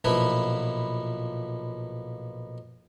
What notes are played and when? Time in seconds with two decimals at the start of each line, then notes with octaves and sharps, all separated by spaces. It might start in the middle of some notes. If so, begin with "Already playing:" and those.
0.04 B1 A#2 F3 E4 B4